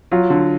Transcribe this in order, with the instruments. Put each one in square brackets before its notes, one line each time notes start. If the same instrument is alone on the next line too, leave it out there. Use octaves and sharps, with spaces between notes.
[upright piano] F#3 [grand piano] F4
[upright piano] D3